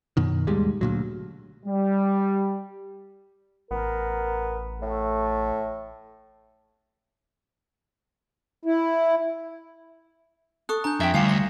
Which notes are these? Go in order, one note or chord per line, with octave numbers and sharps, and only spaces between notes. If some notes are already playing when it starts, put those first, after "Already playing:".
F#2 B2 D#3
D#2 G#2 G3 G#3
D2 A#2 F#3
G3
A1 B3 A#4
A2 A3
E4
A4 C#6 D#6 F#6
D4 G#5 A#5 G6
F2 E5 G5 G#6
D2 G3 F4 F5 G#5 D6 C#7 E7
A#6